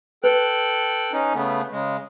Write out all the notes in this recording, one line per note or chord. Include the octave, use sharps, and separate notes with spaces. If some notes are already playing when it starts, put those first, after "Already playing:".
A4 B4 G5 F#6
C#4 D#4
C#3 A3 B3
C#3 G#3